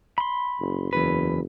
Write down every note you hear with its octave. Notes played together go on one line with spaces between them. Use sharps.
B5 C6
F#1
F#1 E2 B4